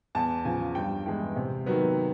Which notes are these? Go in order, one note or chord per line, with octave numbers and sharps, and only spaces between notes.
E2 A5
C#3 F3 G#5
G2 G5
E3 G#3 B3 G5
C3
D#3 F#3 B3